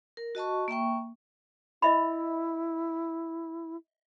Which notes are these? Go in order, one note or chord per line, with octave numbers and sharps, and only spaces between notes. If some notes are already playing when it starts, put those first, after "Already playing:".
A#4
F#4 D#5 A5 C#6
A#3 E5 G5 C#6
E4 D#5 E5 B5